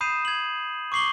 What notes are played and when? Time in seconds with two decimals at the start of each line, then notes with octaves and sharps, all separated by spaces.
0.01 B5 D#6 G6 C7 D#7 E7
0.25 G#6 F#7
0.92 C#6 D6 C7 F#7 G7